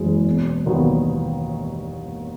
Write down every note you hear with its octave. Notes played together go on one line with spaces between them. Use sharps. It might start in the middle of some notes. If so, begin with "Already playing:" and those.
Already playing: F#1 F#2 E3 G#3
E1
D#2 D#3 F#3 B3